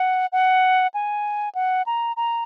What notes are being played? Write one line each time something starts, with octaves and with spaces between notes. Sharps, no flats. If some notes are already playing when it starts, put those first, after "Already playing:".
Already playing: F#5
F#5
G#5
F#5
A#5
A#5